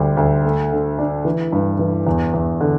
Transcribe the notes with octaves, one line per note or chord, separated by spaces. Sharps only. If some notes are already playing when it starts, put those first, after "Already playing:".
Already playing: D2 G3
D2
A3
D3
D4
E3
G2
E3
E2
E2
D3